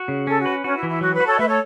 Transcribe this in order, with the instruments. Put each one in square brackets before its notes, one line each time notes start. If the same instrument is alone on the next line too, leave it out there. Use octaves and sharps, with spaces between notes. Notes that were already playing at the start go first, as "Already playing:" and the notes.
Already playing: [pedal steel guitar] F#4
C#3
[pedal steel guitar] C#4 [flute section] A4
[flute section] F#4
[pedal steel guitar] B4
[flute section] C#4 [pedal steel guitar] F#4
[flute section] E4
[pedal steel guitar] E3
[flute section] E4
[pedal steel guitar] F#3 [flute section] F#4
[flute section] B4
[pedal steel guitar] F#4
[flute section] A4 C#5
[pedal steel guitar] A3 [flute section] B4 E5
[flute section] A4 C#5